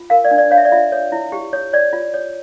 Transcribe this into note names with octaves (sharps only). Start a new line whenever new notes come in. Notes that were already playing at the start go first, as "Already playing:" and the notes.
Already playing: F4
A#4 F5
D5
D4
D5
C#5 F5
E5
D5
F4 E5
C#5
E4
G4
C#5
C#5 D5
F4
C#5